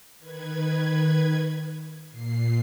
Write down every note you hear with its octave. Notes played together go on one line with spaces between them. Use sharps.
D#3 B4 G#6
A#2 C7